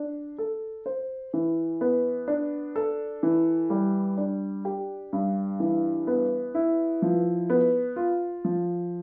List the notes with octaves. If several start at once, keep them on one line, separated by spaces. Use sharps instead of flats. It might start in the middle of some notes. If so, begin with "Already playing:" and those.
Already playing: D4
A4
C5
E3
B3
D4
A4
E3
G3
D4
G4
G2
E3
B3
E4
F3
B3
F4
F3